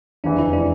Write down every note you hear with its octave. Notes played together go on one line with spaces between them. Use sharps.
F1 E2 E3 D4
E4
D4